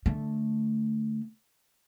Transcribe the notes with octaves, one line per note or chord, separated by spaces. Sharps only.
D3 A3